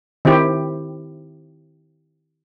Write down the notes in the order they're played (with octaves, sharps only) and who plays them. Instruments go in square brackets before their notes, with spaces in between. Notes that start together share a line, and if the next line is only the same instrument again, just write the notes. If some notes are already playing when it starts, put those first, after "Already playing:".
[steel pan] D#3 C4 E4 G4